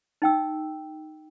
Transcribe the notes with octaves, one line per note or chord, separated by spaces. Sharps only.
D#4 G5 E6